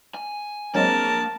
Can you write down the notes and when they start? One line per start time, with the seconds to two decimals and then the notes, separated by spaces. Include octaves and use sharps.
0.15 G#5
0.75 F#3 G#3 A#3 C4 D4 A#4 A5